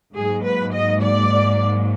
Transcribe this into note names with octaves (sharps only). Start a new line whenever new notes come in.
G#2 F#3 A#3 G#4
B4
D#5
D5